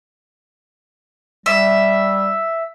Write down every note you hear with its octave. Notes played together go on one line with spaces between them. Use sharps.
G3 E5